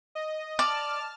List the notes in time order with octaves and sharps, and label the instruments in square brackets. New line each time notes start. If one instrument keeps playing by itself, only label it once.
[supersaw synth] D#5
[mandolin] D5 [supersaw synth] A5 F6